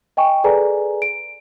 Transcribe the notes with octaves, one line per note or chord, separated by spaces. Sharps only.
D#5 G5 G#5 C#6
G#4 A4 B4 D5 G#5 A#5
D7